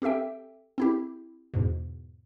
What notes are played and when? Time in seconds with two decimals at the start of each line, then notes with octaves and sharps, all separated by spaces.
0.02 C4 G4 A4 E5 G5
0.78 C4 E4 G4
1.54 E2 G#2 B2